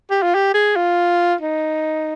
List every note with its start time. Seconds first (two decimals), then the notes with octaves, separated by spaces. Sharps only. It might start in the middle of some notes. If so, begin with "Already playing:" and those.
0.10 G4
0.23 F4
0.35 G4
0.54 G#4
0.76 F4
1.41 D#4